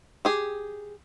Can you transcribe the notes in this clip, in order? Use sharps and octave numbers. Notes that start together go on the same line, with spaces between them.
G4 G#4